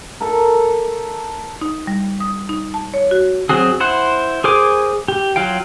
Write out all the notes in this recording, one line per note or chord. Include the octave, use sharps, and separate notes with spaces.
A4 A#4
D#4
G3
D#6
D#4
A5
C#5
F#4
F#3 C4 F#4 G#4
E4 C5 F#5
G#4 A#4 C5 G#5 D6
G4
F#3 F4 F5 G5